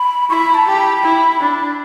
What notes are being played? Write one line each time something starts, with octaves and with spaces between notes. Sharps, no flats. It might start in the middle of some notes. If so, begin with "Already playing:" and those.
Already playing: B5
E4 B5 C#6
A5
G4
B5
E4
D4